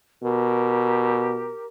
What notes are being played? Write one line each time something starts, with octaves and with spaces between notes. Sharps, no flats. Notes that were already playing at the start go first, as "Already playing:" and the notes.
B2 G4 A#4